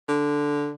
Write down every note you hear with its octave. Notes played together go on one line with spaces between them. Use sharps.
D3